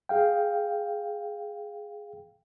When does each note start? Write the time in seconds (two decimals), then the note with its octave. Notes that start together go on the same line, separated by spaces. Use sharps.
0.09 G#4 F5 G5